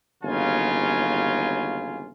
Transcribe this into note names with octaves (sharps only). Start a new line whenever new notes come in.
G1 D#2 C#3 F#3 F4 G#5